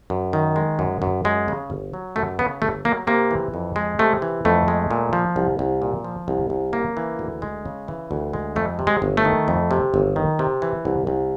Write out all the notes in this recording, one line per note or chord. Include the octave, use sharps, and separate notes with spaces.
F#2
D#3
G#3
F#2
F#2
F#2 G#3
C#3
G1
F#3
F#2 A3
C#3 B3
G1 A3
F#3 A#3
C3 A#3
E3
F2
G#3
C3 A3
E3
F2 A3
G#3
A#2
F3
C2
C2
A#2
F3
C2
C2
C#3 A#3
E3
D2
G#3
C#3
E3
D2
G#3
F2 A3
C3
G#3
G1
A3
D#3
F2
C3
G1
D#3
C3
E3
C2
C2